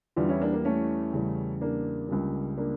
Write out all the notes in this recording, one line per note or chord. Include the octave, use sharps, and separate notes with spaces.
E2 E3 G3 D4 F4
C#4 E4
A#3 D4
A#3
A3 C#4
E2 C#3 G3
A#3 D4
C#2 C#3 G3
A#3 D4